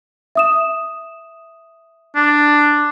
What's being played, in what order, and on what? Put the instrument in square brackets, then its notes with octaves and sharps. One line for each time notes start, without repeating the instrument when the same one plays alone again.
[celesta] E5 D#6 E7
[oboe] D4